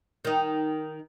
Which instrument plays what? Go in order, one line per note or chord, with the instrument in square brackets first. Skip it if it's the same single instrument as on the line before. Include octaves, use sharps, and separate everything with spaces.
[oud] D#3 D#4